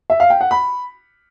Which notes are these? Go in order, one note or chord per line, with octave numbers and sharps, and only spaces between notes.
E5
F5
G5
F#5
B5